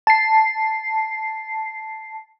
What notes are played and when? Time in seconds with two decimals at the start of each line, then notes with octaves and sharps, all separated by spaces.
0.07 A5 C7